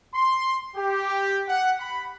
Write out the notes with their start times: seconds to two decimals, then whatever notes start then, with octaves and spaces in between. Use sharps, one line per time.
0.13 C6
0.76 G4
1.48 F#5
1.80 B5